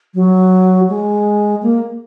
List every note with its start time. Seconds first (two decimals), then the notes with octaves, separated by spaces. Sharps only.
0.15 F#3
0.89 G#3
1.62 A#3